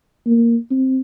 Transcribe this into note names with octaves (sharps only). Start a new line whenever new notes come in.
A#3
C4